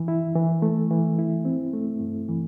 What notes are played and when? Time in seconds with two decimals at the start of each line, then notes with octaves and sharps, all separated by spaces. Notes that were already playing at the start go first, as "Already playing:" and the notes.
Already playing: E3
0.08 E4
0.35 E3
0.62 A3
0.91 E3
1.18 E4
1.45 C4
1.73 A3
2.00 G2
2.29 E3